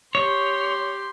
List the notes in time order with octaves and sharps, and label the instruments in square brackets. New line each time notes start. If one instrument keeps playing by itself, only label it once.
[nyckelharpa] G4 C6 [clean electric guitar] C#5